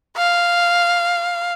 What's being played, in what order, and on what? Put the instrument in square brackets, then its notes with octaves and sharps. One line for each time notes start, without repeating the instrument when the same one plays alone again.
[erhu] F5